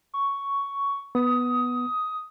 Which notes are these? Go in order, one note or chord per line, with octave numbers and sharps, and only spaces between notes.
C#6
B3 D#6